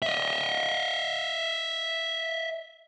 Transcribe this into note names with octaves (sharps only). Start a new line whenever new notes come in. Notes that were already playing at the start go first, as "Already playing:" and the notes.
D#5 E5